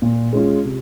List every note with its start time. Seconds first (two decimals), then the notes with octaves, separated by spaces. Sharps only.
0.02 A#2
0.33 G#3 C#4 F4
0.65 C3